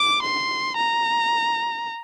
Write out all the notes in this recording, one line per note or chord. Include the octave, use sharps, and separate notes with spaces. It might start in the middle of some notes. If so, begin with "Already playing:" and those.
Already playing: D6
C6
A#5